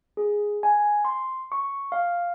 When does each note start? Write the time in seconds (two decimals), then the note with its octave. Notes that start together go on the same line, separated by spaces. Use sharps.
0.17 G#4
0.63 G#5
1.05 C6
1.52 C#6
1.92 F5